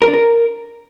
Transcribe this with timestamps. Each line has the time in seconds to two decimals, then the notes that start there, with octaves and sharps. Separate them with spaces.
0.02 A#4
0.08 D4
0.13 A#4